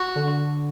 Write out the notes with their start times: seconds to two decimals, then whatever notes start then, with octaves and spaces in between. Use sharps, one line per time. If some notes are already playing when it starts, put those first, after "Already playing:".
Already playing: F#4
0.16 D3